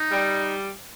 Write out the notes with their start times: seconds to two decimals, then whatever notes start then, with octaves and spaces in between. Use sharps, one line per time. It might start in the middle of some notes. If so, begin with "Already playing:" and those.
Already playing: D#4
0.11 G3